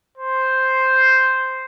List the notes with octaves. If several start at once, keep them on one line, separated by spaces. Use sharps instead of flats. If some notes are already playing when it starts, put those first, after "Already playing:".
C5